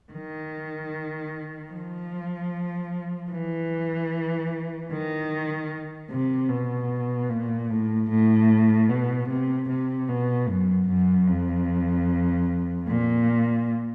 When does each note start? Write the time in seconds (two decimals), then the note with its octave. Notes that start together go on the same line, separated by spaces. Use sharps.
0.13 D#3
1.72 F3
3.32 E3
4.91 D#3
6.11 C3
6.50 B2
7.30 A#2
7.70 A2
8.10 A2
8.89 B2
9.29 C3
9.69 C3
10.09 B2
10.48 F#2
10.89 F#2
11.28 F2
12.88 A#2